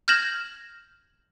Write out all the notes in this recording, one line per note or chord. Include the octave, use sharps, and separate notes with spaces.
F6 G6 G#6 A#6 E7 F#7